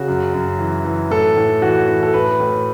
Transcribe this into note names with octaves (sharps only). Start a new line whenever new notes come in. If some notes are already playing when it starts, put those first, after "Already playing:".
Already playing: C#3 F#4
F#2
F#2
E3
E3
A2 A4
A2
E3 F#4
E3
A4
A2 B4
A2